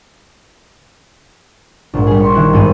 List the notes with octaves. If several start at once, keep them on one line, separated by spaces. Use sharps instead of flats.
A#1 G#2
G3 G#4
C#5 C6
D#3 E4 F#6
G#1 G2 G#4 D#7